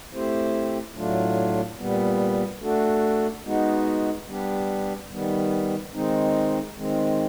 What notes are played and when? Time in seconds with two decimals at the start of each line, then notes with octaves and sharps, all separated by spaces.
0.12 A3 C4 E4 G4 C5
0.94 A2 F#3 A3 D4 F4
1.77 A#2 G3 B3
2.61 A3 D4 F#4 A4
3.44 G#3 B3 D#4 F#4
4.26 G3 B3 D4 G4
5.10 D#3 G3 B3
5.92 D#3 G#3 C4 D#4
6.76 D#3 G#3 C4